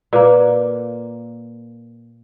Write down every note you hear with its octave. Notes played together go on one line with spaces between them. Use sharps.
A#2 A#3 B4 E6